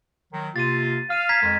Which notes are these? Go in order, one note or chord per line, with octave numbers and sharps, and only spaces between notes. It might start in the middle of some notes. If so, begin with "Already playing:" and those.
D#3 F#3
C3 A#3 F4 A6 D#7
F5 F6 D#7
A#5 G#6 B6
F2 D#3 G#3